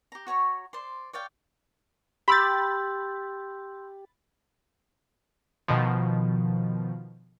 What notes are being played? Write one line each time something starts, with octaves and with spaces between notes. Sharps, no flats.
G4 A#5
F#4 C#5 A#5 C#6
C5 D5 C6
C#5 D5 F5 G5
G4 B5 C6 E6 G6 A6
B2 D#3 F3